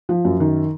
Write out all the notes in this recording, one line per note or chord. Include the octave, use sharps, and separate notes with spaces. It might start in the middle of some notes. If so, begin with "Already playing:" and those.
F3
F#2
D#3